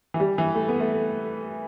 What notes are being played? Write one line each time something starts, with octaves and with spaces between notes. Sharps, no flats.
E3
G3
E3
A3
B3
A3